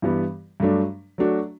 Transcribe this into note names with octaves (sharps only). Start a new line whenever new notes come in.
G2 E3 G3 B3
G2 F#3 A3 D4
F#3 A3 D4 F#4